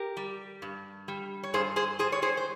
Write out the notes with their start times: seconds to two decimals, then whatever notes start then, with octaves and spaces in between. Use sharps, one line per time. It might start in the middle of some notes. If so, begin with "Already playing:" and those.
Already playing: G4 A#4
0.17 G3
0.62 G2
1.08 G3
1.43 C#5
1.54 G2 G#4 C5
1.76 G#4 C5
1.99 G3 G#4 C5
2.12 C#5
2.22 G#4 C5
2.37 C5